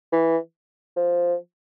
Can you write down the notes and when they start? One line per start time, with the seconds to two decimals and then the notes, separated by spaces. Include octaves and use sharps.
0.12 E3
0.96 F3